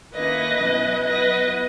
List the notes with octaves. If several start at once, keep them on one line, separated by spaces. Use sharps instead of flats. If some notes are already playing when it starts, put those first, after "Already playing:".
D#3 A#3 C#4 E4 B4 D#5
B2 F#3 C#4 E4
F#3 B3 E4 B4 D#5